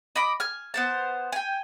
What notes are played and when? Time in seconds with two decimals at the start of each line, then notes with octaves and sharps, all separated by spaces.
0.16 D#5 B5 D6
0.40 G#5 F6
0.74 B3 C5 A5
1.32 G5 G#5